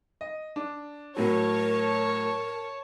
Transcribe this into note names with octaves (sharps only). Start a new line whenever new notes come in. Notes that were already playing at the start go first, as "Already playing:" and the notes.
D#5
D4
A2 F#3 A#4 C#5 A5